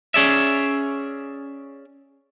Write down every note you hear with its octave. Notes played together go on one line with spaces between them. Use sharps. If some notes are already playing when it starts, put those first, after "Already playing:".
C#4 G#4 D5 E5